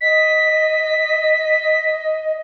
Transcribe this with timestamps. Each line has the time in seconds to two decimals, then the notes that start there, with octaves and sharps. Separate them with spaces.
0.01 D#5 B6